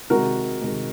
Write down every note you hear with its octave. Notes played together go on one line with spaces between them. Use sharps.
C3 D#3 G#3 F#4 A#4
C3 D#3 G#3